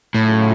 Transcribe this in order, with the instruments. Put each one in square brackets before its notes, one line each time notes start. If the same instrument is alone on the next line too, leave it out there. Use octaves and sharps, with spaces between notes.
[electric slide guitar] A2 [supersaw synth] C#3 F#3 A3 C#4 F4